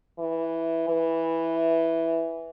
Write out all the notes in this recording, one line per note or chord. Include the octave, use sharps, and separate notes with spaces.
E3
E3